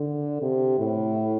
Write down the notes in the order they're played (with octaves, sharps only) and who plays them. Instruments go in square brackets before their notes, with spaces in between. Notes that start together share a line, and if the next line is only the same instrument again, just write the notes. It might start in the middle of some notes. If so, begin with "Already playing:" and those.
Already playing: [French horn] D3
C3
A2